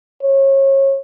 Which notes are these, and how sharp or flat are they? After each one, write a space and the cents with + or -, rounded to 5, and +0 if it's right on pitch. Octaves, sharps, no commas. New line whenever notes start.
C#5 -30